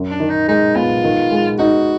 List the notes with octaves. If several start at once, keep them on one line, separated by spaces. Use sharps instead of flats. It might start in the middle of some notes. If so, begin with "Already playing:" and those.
Already playing: F#2
D4
D#3
D#4
G#3 D#4
B3 F4
D#3
G#3
D#4 F#4